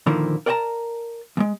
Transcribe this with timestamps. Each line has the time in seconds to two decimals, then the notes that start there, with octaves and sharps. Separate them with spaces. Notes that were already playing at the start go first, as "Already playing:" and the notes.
0.06 A#2 D3 D#3 F3 A#3 E4
0.46 A#4 D5 F#5 G5 A5 A#5
1.37 E2 G#3